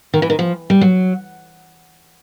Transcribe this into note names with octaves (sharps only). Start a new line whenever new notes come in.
D#3
E3
D#3
F3
G3
F#3